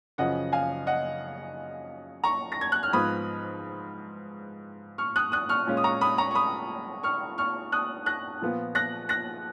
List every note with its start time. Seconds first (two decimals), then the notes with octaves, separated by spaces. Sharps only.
0.18 F#2 C#3 F3 D#5 F#5
0.52 F5 G#5
0.86 D#5 F#5
2.24 A#5 C#6
2.52 A#6
2.61 G#6
2.72 F#6
2.83 F6
2.93 G#2 F3 B3 F4 B5 D#6
4.98 C#6 F6
5.16 D#6 F#6
5.32 D#6 F#6
5.49 C#6 F6
5.67 A#2 G#3 C#4 F4
5.77 D#6
5.84 A#5 C#6
6.01 B5 D#6
6.18 A#5 C#6
6.31 C#6
6.35 B5 D#6
7.03 C#6 F6
7.38 C#6 F6
7.72 D#6 F#6
8.06 F#6 A#6
8.41 A#2 F3 B3 F4
8.75 F#6 A#6
9.09 F#6 A#6